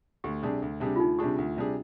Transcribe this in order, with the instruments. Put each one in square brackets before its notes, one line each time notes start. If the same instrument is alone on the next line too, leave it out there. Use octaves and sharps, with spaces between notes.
[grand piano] D2 [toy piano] G4
[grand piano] C3 G3 D4 G#4
D2
C3 G3 D4 G#4
[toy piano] F4
[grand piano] D2 [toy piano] D#4
[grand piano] C3 G3 D4 G#4 [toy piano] G4
[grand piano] D2
C3 G3 D4 G#4